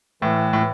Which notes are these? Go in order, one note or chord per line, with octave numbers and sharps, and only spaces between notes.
A2 E3
A2